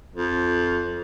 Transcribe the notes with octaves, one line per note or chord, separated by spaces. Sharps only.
F2